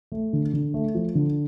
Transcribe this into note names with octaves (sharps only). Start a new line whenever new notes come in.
A3
D3
D3
A3
F3
D3